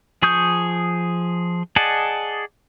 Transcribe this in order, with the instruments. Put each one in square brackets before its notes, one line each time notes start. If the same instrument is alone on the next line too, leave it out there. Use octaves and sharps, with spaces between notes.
[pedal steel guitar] F3 G#4 C#6 D#6 G6
G#4 D5 D#5 F#5 A5